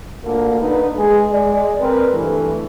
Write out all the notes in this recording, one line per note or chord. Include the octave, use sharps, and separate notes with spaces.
D2 A#2 D3 A#3
D3 D#4 B4
G#3 G#4
G#3 D5
C4 A#4 B4
G2 E3 A3